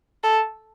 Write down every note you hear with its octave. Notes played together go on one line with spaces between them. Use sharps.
A4